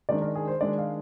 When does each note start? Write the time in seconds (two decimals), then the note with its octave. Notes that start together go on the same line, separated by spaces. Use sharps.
0.09 D#3 G#3 D4 D5
0.22 A#4
0.35 G#4
0.48 C5
0.61 D#3 G#3 D4 D5
0.78 F5